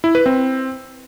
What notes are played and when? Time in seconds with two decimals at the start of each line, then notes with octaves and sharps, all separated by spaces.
0.04 E4
0.15 B4
0.26 C4